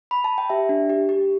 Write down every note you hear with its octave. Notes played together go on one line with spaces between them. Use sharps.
B5
A5
G5
G4 E5
D4
G4
G4